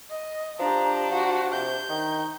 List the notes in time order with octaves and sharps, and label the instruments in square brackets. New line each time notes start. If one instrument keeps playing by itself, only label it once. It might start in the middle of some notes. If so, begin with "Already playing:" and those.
[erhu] D#5
[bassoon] F3 [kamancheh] D4 G4 [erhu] A#5
[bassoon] F3 [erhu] F#4
[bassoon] C3 [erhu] G6
[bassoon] D#3